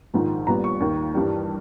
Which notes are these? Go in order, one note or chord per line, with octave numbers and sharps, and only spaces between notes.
A#1 G#2 D#3
A#1 A#2 G3 B3 A#5
C#6
D#2 D#3 A#3
G2 E3 G3